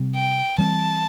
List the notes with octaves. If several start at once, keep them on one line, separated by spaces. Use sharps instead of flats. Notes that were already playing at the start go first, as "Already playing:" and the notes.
Already playing: C3 G3 C4
G5
E3 G3 C4 A5